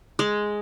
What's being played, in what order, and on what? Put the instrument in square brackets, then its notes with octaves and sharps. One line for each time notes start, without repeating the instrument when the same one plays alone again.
[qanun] G#3